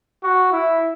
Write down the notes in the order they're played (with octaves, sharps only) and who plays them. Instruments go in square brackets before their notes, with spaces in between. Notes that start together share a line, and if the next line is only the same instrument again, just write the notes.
[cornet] F#4
E4